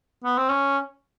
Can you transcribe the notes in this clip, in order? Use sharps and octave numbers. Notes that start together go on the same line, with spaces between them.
B3
C4
C#4